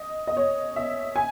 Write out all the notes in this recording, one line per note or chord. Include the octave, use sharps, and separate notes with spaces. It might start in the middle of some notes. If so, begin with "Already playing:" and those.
Already playing: D#5
D#5
C#5
E5
G#5